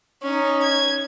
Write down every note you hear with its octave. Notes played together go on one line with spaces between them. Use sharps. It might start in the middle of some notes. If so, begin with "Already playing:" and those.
C#4 D#4
G#6